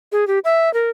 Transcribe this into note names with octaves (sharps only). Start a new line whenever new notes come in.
G#4
G4
E5
A#4